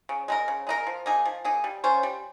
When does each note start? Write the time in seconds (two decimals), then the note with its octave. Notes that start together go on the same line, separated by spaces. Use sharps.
0.09 C#3
0.28 G#3 D#4 A#4
0.48 C#3
0.67 G#3 D#4 A#4
0.87 F3
1.06 A#3 D#4 G#4
1.25 F3
1.45 A#3 D#4 G#4
1.64 G3
1.84 C#4 F4 C5
2.03 G3